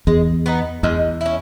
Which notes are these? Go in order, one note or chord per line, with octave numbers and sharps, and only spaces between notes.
E2 G#3
B3 D#4
E2 G#3
C#4 E4